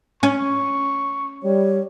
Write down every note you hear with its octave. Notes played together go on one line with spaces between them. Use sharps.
C#4 C#6
G3 C#5